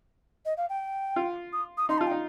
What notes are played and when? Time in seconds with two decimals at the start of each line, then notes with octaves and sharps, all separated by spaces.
0.45 D#5
0.57 F5
0.69 G5
1.16 F4
1.52 D#6
1.77 D#6
1.89 D#4 C6
1.97 A5
2.01 F4
2.07 G5
2.11 D#4